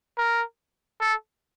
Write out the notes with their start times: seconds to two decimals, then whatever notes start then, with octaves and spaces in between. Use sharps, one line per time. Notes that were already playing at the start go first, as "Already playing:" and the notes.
0.18 A#4
1.01 A4